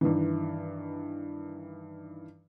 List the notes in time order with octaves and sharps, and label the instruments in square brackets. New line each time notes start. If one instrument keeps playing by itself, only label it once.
[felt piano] G2 D#3 E3